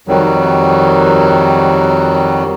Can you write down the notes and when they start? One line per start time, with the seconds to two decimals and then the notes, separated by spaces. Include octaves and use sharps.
0.08 F2 D#3 F#3 G3